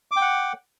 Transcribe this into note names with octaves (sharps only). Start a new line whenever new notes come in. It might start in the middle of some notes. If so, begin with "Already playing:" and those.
F#5 G5 D6